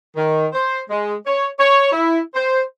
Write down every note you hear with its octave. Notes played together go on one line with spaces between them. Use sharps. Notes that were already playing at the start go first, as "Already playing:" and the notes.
D#3
C5
G#3
C#5
C#5
E4
C5